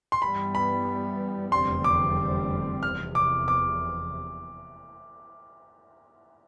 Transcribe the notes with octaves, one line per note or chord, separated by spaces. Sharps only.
C6
G2 E3 G3 B3 B5
B5
F1 E2 D3 G3 C4 C6
D6
F1 E2 C3 F6
D6
D6